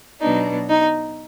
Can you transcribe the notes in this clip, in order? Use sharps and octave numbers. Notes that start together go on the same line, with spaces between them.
B2 F#3 B3 D4 D#4
D#4